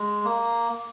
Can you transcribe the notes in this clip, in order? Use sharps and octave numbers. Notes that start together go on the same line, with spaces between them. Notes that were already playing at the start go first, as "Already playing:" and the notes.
Already playing: G#3
A#3